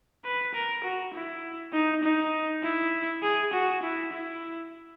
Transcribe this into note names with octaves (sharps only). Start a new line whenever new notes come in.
B4
A#4
F#4
E4
D#4
D#4
E4
G#4
F#4
E4
E4